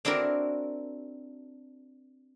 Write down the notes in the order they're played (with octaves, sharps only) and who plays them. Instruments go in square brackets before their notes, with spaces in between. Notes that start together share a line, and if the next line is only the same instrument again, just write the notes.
[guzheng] C4 D4 E4 F#4 A#4